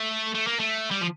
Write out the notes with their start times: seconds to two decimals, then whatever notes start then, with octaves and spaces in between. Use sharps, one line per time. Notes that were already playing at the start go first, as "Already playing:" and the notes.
Already playing: A3
0.35 A3
0.47 A#3
0.60 A3
0.91 G3
1.01 F3